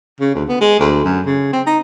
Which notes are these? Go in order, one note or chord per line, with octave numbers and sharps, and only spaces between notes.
C#3
D2
B3
G#3
D2
F#2
C#3
C4
D#4